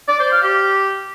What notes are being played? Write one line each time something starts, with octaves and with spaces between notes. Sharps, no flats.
D5
C5
F5
G4